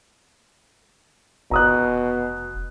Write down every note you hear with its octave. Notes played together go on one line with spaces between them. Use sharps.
F1 B2 A#5 D#6 F#6